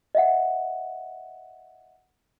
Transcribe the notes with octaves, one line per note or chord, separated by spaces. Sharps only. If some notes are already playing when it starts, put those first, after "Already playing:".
D#5 E5 F#5